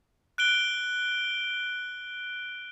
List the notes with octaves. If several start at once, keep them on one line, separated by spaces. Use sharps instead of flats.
F#6 D7 G7